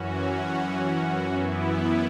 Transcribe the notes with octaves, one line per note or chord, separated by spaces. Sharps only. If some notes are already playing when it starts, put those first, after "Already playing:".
Already playing: F#2 E3 C#4 F#4
F#2 E3 B3 E4